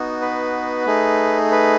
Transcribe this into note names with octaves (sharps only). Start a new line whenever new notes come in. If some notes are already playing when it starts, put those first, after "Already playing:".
Already playing: B3 D#4 F#4
B4
A3 D#4 G#4
B4